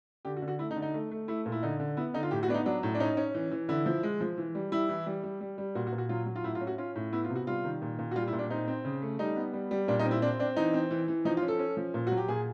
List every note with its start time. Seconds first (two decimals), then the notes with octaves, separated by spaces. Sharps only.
0.25 D3 G4
0.37 F#4
0.42 D3
0.48 F#4
0.59 A3 E4
0.71 D#4
0.76 D3
0.82 D#4
0.94 A3
1.11 A3
1.28 A3 E4
1.46 A#2
1.52 E4
1.63 D3 D#4
1.80 D3
1.97 B3 E4
2.14 D3 D#4
2.23 F4
2.31 A2 G4
2.43 F#4
2.48 B3 D4
2.54 D#4
2.66 F#3 D4
2.83 A2
2.95 D4
3.00 C#4 D#4
3.17 C#4
3.35 E3
3.51 E3
3.69 D3 E4
3.86 F3
4.03 G#3
4.21 F3
4.38 E3
4.55 G3
4.72 G3 E4
4.89 E3
5.06 G3
5.24 G3
5.41 G3
5.58 G3
5.75 A#2 F#4
5.87 F#4
5.93 A#2
5.98 F#4
6.09 F#3 F4
6.26 F#3
6.36 F4
6.44 A2 E4
6.55 F4
6.61 C#4
6.67 F#4
6.78 C#4 F4
6.96 A2
7.13 B3 E4
7.24 F4
7.30 C3
7.35 F#4
7.47 G3 F4
7.64 D#3
7.82 A#2
7.99 A#2
8.11 F#4
8.16 G3 F4
8.27 E4
8.33 A#2
8.39 D4
8.50 C4 D#4
8.68 C4
8.85 C#3
9.02 A3
9.19 G3 D#4
9.36 B3
9.53 G3
9.71 G3
9.88 A#2 D4
9.99 D#4
10.05 C4
10.11 E4
10.22 C4 D4
10.39 C4 D4
10.57 E3 D#4
10.74 C4
10.91 E3
11.08 E3
11.25 F3 D#4
11.37 F4
11.43 C#4
11.48 A4
11.59 C#4
11.77 F3
11.94 A#2
12.07 F#3 F#4
12.17 G4
12.28 A#2 G#4